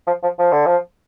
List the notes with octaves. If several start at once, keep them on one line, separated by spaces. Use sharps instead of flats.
F3
F3
F3
D3
F3